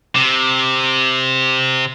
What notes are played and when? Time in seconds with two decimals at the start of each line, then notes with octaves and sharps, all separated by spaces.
0.16 C3